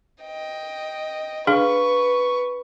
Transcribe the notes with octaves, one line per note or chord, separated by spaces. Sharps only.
D#5 G5
D4 G#4 B4 F5 C#6